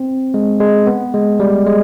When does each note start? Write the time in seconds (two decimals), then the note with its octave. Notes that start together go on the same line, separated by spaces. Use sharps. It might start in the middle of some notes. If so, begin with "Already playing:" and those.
Already playing: C4
0.34 G#3
0.60 G#3
0.87 B3
1.14 G#3
1.40 G3
1.67 G#3